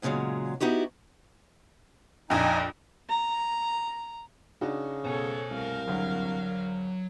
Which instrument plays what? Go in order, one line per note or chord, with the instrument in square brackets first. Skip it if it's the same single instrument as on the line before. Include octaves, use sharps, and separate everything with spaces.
[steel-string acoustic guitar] E2 A#2 C#3 F#3 G#3
B3 D#4 E4 F#4 G4
[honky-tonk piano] A#1 F2 [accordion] D#4 G#5
[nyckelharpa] A#5
[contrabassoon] C#3 [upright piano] D4 D#4 F#4
[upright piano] B2 [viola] A4 C#5 [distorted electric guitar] C5 G#5
[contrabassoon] C2 [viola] A#4 F5
[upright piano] G#1 D2 [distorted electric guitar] F#3